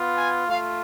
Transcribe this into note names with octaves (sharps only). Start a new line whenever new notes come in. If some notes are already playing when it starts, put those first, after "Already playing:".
Already playing: B3 F4
G#5
A3 F4 F5